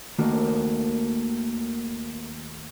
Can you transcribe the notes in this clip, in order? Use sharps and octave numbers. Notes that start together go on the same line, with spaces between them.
D#2 D#3 A3 A#3 F#4 A#4